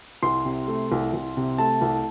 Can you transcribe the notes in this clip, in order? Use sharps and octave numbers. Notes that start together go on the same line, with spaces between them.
C2 C6
C3
A3
C2
C2
C3
A3 A5
C2